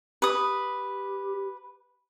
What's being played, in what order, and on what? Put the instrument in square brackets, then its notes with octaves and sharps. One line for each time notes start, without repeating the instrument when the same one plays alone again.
[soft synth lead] G4 [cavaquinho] B4 D#6